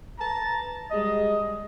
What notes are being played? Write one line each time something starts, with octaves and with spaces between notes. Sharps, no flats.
B4 A5 A#5
G3 G#3 D#5